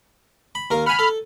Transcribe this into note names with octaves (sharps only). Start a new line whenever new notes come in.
B5
D#2 A#4 F5
F#5 G#5 B5 F6
A4